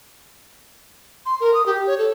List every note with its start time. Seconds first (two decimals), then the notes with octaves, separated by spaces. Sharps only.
1.26 C6
1.40 A#4
1.54 D#6
1.66 G4
1.87 C#5
1.98 A4